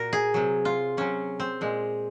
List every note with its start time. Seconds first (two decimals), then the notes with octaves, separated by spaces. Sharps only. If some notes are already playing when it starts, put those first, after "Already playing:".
Already playing: A#2 F#4 A#4
0.13 G#4
0.34 C3 F#3
0.65 F4
0.97 C3 F#3 C#4
1.40 C4
1.61 A#2 G#3